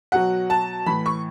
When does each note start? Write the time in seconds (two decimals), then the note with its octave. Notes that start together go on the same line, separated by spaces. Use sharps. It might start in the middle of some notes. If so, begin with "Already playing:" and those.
0.12 B2 F#3 F#5
0.50 A5
0.86 A2 E3 B5
1.06 C#6